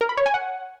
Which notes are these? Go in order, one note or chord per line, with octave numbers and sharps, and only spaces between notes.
A#4
B5
C#5
G#5
F#5